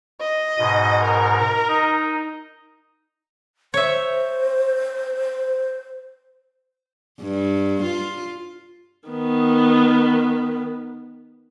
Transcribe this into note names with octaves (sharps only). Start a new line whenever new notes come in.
D#5
G#2 B2
A#4
D#4 D#5
C5 C#5 E5
G2
F4
D#3 B3